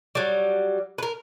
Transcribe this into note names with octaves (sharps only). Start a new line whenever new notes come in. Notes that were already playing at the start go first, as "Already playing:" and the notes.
F#3 G3
A#4 B4